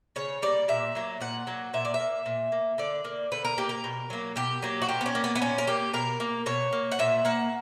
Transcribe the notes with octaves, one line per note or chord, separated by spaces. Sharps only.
C#3 C#5
G3 A#3 D5
A#2 E5
F#3 A#3
A#2 F#5
F#3 A#3
A#2 E5
D5
E5
A#3
A#2
A#3
D3 D5
A#3
D3 B4
A#4
A#3 G4
A#4
B2
F#3 A#3
B2 G4
F#3 A#3
F#4
A#2 G4
B3
C#4
A#3
B3
B3
A#2 C#4
A#4
A#3 G4
B2 A#4
A#3
B2 C#5
A#3
F#5
A#2 E5
A#3 F#5